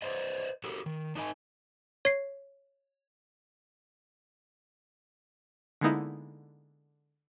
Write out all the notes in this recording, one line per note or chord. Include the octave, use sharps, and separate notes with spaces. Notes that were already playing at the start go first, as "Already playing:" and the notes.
B4 C5 D5 D#5
F#4 G4 A4 A#4
D#3
D4 D#4 A#4 D#5 G#5
C#5 C7
D3 G#3 A#3 B3 D#4 E4